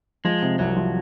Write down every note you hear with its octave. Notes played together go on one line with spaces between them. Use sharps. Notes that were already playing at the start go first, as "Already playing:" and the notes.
F3 G#3
C3
C2 F#3
F3